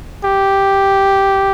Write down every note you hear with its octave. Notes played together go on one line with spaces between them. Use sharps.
G4